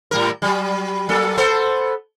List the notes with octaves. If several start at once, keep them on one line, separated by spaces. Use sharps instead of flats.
A2 G3 A#4
F#3 G3
F#3 A#3 A4
B3 A4 C5